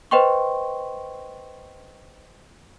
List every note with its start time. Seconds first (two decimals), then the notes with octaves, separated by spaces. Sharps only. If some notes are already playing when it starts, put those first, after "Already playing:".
0.11 B4 C5 D#5 G5 C6 C#6